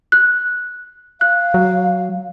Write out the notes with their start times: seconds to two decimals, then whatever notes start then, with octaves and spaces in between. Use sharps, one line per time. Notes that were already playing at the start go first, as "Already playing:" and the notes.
0.12 F#6
1.21 F5 F#6
1.54 F#3